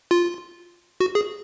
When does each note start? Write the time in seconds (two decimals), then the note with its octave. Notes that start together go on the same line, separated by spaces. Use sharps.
0.11 F4
1.00 F#4
1.15 G#4